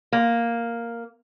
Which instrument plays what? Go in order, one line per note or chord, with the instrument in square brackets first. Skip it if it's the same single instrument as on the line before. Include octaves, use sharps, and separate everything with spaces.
[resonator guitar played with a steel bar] A#3